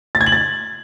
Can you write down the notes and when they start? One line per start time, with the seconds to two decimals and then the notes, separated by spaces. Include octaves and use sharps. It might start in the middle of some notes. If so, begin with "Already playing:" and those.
0.15 A6
0.21 G#6
0.26 F#7
0.32 A6